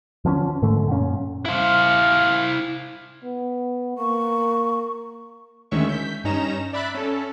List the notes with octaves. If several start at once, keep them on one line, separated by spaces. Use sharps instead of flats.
D3 F3 A#3 C#4
G#2 D3 A3
F#2 A#2 C#4
E4 C5 F5
B3
A#3 C#6
D2 D#3 G#3 C#4 E5 C#6
G6 B6
G2 C#4 D#4 A#5 E7
D5 E5 B5 F#6 A6 B6
C#4 A4